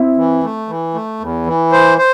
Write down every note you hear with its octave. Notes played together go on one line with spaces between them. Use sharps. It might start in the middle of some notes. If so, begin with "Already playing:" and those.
Already playing: C4 E4
E3
A3
E3
A3
E2
E3
C5
C5